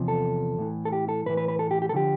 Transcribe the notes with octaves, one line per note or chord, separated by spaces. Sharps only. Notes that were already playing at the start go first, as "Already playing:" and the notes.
Already playing: E2 C3 F3
A4
A2 E3
A4
G4
A4
A2 E3 B4
B4
B4
A4
G4
G4
A4
D3 F3 G4